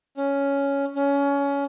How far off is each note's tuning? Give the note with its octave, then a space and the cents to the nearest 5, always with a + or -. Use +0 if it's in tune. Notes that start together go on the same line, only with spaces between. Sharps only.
C#4 +5
C#4 +20